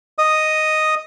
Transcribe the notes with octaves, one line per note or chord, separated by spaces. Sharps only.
D#5 D#6